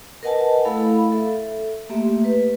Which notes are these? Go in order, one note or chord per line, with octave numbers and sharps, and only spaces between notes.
A#4 B4 D#5 F#5 G#5 A5
A3 E4 A4 F5 B5
A4 E5
A3 A#3 G4 E5
B4